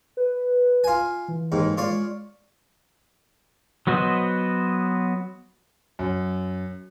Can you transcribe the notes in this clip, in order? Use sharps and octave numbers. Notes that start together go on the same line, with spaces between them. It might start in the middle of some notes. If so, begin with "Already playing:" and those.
B4
F4 G#5
E3
D#2 G#2
G#3 F4 C#5 D5
F#3 B3 F#4 C5 D#5
F#2